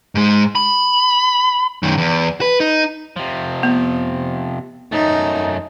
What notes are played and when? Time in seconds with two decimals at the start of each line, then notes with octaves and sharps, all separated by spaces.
0.15 G#2 G#3
0.55 B5
1.83 F#2 D#3
1.98 E2
2.41 B4
2.60 D#4
3.16 C3 F3
3.63 B3
4.92 F#2 A3 D#4